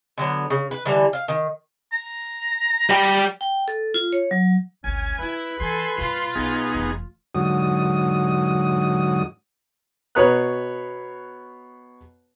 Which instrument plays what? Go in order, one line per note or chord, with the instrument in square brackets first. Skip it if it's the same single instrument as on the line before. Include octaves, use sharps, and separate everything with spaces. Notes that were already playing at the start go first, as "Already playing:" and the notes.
[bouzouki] D3 F#3 B3
C#3
B4
D3 E3 G3
F5
D#3
[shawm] A#5
[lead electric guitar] G3 G5
[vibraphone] G5
A4
F4
C#5
F#3
[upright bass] G#1 D2 [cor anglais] C#4 [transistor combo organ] G#5
[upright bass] D4 F4 [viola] E4 [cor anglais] B4
[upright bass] E3 [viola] A4 G#5 [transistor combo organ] C6
[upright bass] G2 A#2 [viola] F4
[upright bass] B1 [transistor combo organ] B3 D#4 G#4
[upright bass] F1 E3
[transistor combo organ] G#2 D3 F#3 F#4 D#6
[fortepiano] B2 B4 C#5 A#5 D#6 F#6